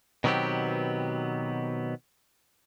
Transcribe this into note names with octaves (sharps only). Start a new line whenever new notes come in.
B2 D#3 F#3 B3 C4 G4